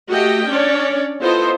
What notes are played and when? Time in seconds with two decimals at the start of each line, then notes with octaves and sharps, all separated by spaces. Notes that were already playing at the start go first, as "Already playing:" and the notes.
0.10 A3 F#4 G4 D#5 G5
0.49 C#4 D4 C#5 D5
1.20 B3 E4 F4 A4 C5 D#5